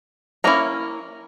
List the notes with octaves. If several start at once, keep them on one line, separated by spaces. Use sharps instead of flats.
F#3 A#3 C#4 E4 A#5